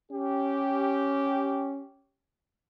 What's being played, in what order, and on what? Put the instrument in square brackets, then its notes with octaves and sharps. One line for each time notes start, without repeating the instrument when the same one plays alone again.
[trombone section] C#4 G4